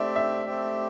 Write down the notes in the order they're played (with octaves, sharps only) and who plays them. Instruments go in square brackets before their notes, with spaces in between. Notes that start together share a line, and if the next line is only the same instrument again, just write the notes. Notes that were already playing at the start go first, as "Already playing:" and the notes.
Already playing: [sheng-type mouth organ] A3 C4 G4 [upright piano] D5 E5
[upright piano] E5
[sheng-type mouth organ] A3 C4 G4